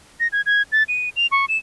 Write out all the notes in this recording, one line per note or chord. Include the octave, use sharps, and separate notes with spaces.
A#6
G#6
G#6
A6
D#7
F7
C#6
E7